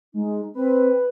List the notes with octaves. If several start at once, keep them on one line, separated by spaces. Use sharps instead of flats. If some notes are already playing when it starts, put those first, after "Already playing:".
G#3 D#4
C4 B4